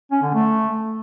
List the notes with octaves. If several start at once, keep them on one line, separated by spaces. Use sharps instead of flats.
C#4
D3
A3